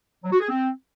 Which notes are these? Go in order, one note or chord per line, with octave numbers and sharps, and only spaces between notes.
F#3
F#4
G#4
C4